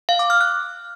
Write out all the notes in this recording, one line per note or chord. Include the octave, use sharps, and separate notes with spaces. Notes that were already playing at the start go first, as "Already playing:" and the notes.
F5
D6
F6
F#6